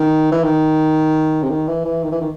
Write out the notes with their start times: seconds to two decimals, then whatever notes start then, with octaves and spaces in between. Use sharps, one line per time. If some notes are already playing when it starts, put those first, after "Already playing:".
Already playing: D#3
0.32 E3
0.44 D#3
1.43 C3
1.50 D#3
1.68 E3
1.85 E3
2.04 D#3
2.12 E3
2.21 D#3